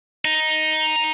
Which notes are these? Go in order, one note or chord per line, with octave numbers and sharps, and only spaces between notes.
D#4